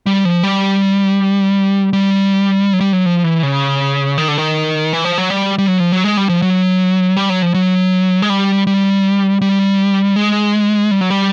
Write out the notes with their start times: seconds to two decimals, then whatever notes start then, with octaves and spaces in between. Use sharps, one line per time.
0.06 G3
0.25 F3
0.43 G3
1.93 G3
2.73 F#3
2.80 G3
2.93 F#3
3.06 F3
3.24 E3
3.43 C#3
4.18 D#3
4.28 D3
4.38 D#3
4.93 E3
5.05 F3
5.18 F#3
5.30 G3
5.58 G3
5.68 F#3
5.80 F3
5.92 F#3
6.04 G#3
6.17 G3
6.29 F3
6.42 F#3
7.17 G3
7.30 F#3
7.42 F3
7.54 F#3
8.22 G#3
8.30 G3
8.67 G3
9.41 G3
10.16 G#3
10.91 G3
11.01 F#3
11.10 G3